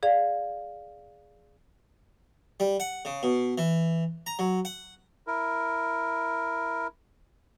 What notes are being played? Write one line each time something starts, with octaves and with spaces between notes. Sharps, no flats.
G#4 D5 F5
G3
F#5
C#3
B2
E3
A#5
F#3
F#5
E4 A#4